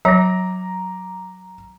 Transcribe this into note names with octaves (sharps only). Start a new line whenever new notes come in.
F#3 C#5 A#5 D6 A#6